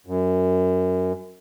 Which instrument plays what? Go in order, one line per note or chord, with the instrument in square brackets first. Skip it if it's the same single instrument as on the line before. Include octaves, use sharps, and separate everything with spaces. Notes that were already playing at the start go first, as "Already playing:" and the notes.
[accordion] F#2